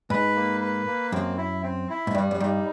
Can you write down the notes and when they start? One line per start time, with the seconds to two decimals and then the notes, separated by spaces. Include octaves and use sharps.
0.10 G#2 B4
0.36 A#3
0.61 B4
0.87 A#3
1.12 F#2 C4
1.38 E4
1.63 C4
1.90 E4
2.07 G#2
2.14 G2 G3
2.31 F#2
2.40 G2 D#4